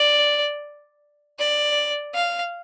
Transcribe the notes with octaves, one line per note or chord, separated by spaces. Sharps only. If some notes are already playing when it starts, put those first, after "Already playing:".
Already playing: D5
D5
F5